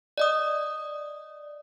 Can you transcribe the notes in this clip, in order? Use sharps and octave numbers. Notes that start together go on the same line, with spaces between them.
D5 D#5 D#6